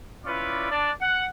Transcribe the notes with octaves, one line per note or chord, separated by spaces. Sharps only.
C#4 E4 F4 B4 D5
D4 D5
F#5